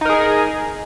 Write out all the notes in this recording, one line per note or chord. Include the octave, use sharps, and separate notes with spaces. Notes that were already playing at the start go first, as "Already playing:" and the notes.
D#4 G#4 A#4